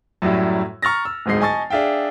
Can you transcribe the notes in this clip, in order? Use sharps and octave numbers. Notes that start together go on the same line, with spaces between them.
F#2 A2 F#3 G3 E4
A#5 C#6 F6 A6 A#6
E6
D1 G#1 G#2 G#3 D#5 C7
D#5 G#5 A5 C#6 A6
D4 G#4 E5 F5 G5